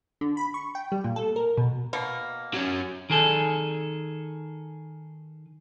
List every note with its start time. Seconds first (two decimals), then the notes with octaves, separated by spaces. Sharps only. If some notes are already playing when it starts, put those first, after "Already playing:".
0.21 D3
0.37 B5
0.54 C#6
0.75 G5
0.92 G3
1.04 A#2
1.16 A4
1.36 A#4
1.57 B2
1.93 B2 A#3
2.54 F#3 C#4
3.10 D#3 G#4 A4